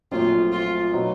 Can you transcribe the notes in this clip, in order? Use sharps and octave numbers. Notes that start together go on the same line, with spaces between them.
A#1 A#2 F#3 A3 C4 F4
F4
B2 F#3 B3 D#4